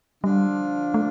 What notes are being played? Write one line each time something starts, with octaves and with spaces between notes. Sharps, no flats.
D3 F3 G3 D4 F4
A3